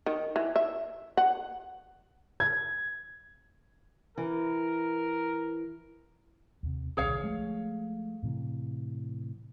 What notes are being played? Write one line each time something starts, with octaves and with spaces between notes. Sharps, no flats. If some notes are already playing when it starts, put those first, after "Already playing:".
D#3
E3
E5
F#5
G#6
E3 A#4
D#2 C3
D1 B1 D3 G#4 C#5 F5
F3 G#3 A3
A2 C3 E3